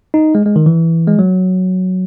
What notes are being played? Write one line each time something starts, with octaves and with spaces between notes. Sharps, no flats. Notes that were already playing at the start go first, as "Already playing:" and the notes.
D#4
G#3
G#3
D#3
E3
G#3
F#3